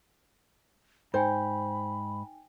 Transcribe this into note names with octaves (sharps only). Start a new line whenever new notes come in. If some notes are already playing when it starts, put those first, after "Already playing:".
G#2 D#4 C5 G5 G#5 B5